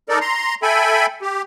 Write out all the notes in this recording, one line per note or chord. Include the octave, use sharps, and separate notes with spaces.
D#4 A4 A#4 D5
A#5 C6
A4 E5 G5 G#5 B5
G4